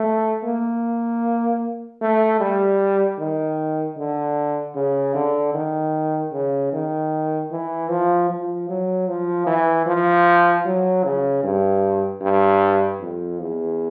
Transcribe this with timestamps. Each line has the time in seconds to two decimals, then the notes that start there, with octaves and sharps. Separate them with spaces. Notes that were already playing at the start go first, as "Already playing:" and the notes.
Already playing: A3
0.44 A#3
2.01 A3
2.40 G3
3.19 D#3
3.98 D3
4.75 C#3
5.15 D3
5.54 D#3
6.33 C#3
6.73 D#3
7.52 E3
7.90 F3
8.30 F3
8.69 F#3
9.08 F3
9.47 E3
9.86 F3
10.65 F#3
11.04 C#3
11.44 G2
12.22 G2
13.01 F2
13.41 E2